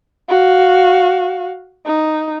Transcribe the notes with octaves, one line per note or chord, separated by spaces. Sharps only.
F#4 F5
D#4